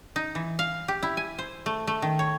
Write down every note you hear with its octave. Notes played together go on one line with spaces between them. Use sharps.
D#4
E3
F5
G4
E4
G#5
C5
A3
A3
D#3
C#5